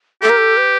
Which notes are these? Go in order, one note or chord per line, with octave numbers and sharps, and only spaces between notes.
G4 A4
A#4
A4
B4